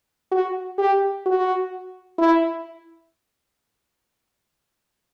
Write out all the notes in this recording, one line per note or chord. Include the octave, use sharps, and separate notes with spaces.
F#4
G4
F#4
E4